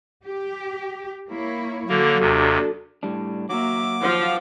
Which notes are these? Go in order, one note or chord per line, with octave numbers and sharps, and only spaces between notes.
G4
A#3 E4 C#5
D3 F#3 A#3 F#4 A4
D#2 C3 D4
A2 G3 D4
F#3 A#3 F#4 E5 D6
F3 F5 F#5